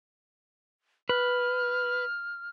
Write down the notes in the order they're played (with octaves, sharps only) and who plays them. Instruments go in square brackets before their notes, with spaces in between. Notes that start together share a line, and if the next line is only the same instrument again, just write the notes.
[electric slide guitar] B4 [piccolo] F6